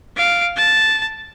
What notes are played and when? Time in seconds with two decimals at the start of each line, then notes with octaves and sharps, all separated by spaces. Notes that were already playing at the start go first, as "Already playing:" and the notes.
0.17 F5 D7
0.56 A5